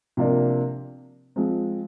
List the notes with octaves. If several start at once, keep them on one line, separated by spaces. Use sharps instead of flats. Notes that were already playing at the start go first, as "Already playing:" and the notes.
C3 F3 A#3 D4
F3 G#3 C4